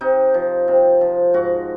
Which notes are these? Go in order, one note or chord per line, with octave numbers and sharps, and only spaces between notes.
C3 D#4
F3
C3
F3
G#2 F#4